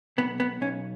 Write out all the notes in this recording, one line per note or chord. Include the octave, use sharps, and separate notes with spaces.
B1 B3
B3
B1 C#4